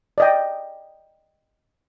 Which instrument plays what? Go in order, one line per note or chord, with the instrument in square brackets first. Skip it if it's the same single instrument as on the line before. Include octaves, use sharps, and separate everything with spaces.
[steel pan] D5 D#5 G5